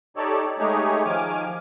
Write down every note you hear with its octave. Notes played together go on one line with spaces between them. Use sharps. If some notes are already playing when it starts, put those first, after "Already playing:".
D#4 G4 A4 C#5 D5
G#3 A3 D#4 G4 G#4 C#5
D#3 F3 G#5 D6 F6